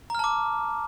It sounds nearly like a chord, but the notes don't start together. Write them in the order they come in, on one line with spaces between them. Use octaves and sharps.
A#5 F6 A5 D6